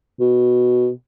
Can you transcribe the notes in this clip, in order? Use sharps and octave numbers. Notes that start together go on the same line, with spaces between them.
B2